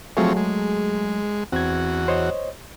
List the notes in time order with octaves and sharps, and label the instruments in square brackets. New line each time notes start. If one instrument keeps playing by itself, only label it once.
[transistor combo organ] F3 C4 C#5 [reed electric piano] F#3 A3 G#4
[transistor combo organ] G#3
[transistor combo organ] E2 F#4 [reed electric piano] C4 G#6
[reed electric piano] C5 C#5 D#5